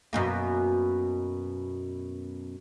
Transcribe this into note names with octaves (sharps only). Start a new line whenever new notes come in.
F#2 B2 A#3